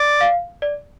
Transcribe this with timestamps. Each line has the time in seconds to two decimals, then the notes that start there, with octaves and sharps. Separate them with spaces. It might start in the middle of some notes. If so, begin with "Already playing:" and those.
Already playing: D5
0.21 F5
0.62 D5